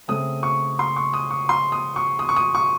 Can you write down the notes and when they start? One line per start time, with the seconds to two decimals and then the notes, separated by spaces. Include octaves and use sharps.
0.08 C#3 A3 C4 D#6
0.43 C#6
0.79 C6
0.96 C#6
1.13 D#6
1.31 C#6
1.49 C6
1.72 D#6
1.96 C#6
2.19 D#6
2.29 C#6
2.36 D#6
2.55 C#6